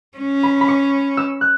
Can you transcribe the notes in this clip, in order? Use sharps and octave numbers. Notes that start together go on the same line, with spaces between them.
C#4
B5
B5
C#6
E6
F#6